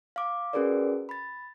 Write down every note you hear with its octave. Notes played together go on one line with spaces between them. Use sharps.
F5 D6
C#4 F#4 G#4 A#4 B4 D5
B5 A6